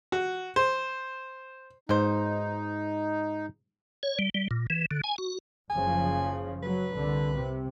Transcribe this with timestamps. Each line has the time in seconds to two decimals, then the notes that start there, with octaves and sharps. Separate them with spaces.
0.12 F#4
0.56 C5
1.89 G#2 B2 D#4 C5
4.03 C#5
4.19 G3
4.34 G3
4.51 A#2
4.70 E3
4.91 D3
5.04 G#5
5.18 F#4
5.70 F#1 C#3 F3 G#5
6.63 F#3 B4
6.97 C2 D3
7.34 C3